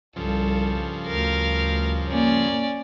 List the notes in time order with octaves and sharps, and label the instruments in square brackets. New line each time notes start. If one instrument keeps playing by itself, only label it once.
[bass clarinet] C2 [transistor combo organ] G2 C#3 F3 [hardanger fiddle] A4
[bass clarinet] D2 [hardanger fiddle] A#4 F5
[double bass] A#3 [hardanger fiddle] C#4 D5